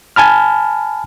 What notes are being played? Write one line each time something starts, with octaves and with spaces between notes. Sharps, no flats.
G#5 A5 B5 F6